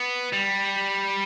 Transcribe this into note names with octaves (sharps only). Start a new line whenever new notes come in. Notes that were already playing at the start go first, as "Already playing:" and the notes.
Already playing: B3
G3